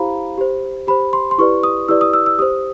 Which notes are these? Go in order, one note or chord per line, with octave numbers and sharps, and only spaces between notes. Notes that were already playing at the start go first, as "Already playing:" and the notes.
Already playing: E4 G4 C5 F5 A#5 B5
G4 C5
G4 C5 B5
C6
C6
E4 G4 B4 D5 C#6
D#6
E4 G4 B4 D5 E6
D#6
E6
E6
G4 C5 D#6